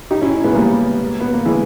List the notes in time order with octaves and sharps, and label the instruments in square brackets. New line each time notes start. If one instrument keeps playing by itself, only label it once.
[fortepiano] D#4 G4
C#4 E4
G#3 B3
G3 A#3
B3
A#3
E3 G#3